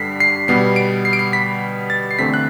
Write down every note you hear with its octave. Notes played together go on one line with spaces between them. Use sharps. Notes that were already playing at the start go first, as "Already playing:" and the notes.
Already playing: G2 D3 G3 B6 C7
C7
B2 G3 B3 C7
D7
C7
D7
C7
B6
A6
C7
E2 D3 A3 C4 B6
F#6